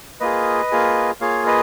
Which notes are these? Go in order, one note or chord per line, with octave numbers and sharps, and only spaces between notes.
A#3 F4 G#4 B4 D#5
A#3 F4 G#4
A#3 F4 G#4 C#5 F5
B4 D#5